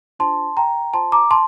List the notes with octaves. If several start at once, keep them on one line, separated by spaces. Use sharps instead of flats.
D4 F4 C5 A5 C6
G5 A#5
F4 C5 A5 C6
A#5 D6
A5 C6